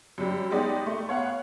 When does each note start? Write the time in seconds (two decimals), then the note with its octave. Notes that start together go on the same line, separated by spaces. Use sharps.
0.18 F#2 G3
0.51 G#3 B3 D#4 G4 D5
0.86 A3
1.08 B3 C#5 F5 F#5